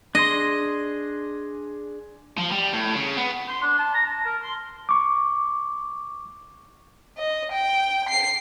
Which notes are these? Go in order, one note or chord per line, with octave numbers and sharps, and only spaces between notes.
D4 G#4 D#5 C6
F3
G3
A2
C#3
B3
C6
D4
A5
A#5
A5
A#4
C6
C#6 D6
D#5
G5
C7